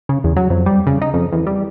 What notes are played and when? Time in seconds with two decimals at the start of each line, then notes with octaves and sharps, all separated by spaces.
0.09 C#3
0.24 E2
0.36 F#3
0.50 F2
0.66 G3
0.87 C#3
1.02 D#4
1.14 F2
1.32 E2
1.47 G3